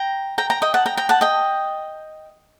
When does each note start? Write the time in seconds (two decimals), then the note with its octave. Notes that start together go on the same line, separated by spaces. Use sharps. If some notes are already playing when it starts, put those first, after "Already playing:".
Already playing: G5 A#5
0.38 G5 A#5
0.50 G5 A#5
0.62 D#5 G5
0.74 F#5 A5
0.86 G5 A#5
0.97 G5 A#5
1.09 F#5 A5
1.21 D#5 G5